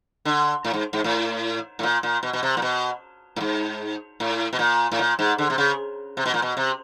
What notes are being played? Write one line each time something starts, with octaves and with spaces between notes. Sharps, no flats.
D3
A2
G#2
G#2
A2
A2
A#2
A#2
B2
B2
C3
A#2
B2
A2
G#2
A2
B2
A#2
A2
A#2
G#2
D3
C3
C#3
C3
B2
A#2
B2
C3